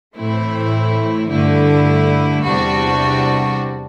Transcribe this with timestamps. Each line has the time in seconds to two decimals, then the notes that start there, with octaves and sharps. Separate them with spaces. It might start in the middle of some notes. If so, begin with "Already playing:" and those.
0.17 A2 E3 A3 C4 E4
1.30 G2 D3 A3 E4
2.44 E2 C3 G3 D4 F#4